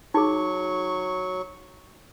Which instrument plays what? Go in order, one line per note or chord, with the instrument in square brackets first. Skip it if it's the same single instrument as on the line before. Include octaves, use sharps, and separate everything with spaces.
[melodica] F#3 C#6 [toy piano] D#4 G#4